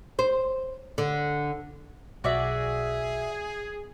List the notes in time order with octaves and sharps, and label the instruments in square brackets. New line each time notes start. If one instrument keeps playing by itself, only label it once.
[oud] C5
D3
[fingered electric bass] B1 [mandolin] F#4 D5 E5 [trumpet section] G#4